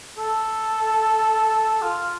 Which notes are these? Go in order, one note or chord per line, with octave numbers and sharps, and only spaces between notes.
A4
F4